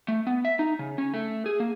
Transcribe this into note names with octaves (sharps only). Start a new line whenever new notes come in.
A3
B3
E5
D#4
C#3
C#4
A3
G#4
A#3